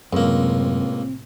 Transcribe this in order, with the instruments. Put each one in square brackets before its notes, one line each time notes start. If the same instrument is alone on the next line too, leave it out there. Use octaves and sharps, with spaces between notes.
[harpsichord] C#2 A#3 [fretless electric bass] F#2 [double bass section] A2 C3 [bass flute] C4